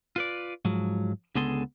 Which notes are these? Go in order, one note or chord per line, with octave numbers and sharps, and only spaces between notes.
F4 B4 D5
G#2 F3 F#3
C#2 D3 B3 G#4 A4 C6